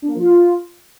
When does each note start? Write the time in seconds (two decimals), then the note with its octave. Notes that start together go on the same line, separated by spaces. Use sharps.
0.02 D4
0.08 A#3
0.14 F3
0.20 F4